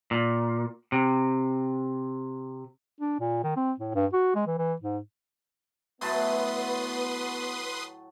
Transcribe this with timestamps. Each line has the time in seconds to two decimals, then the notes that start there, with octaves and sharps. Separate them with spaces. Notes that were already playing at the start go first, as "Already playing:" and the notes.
0.11 A#2
0.92 C3
3.00 D4
3.20 A#2
3.43 D#3
3.56 C4
3.79 A2
3.95 G2
4.13 F#4
4.35 G#3
4.47 E3
4.58 E3
4.81 G#2
6.01 A2 F#3 B3 B4 A5 C6 D#6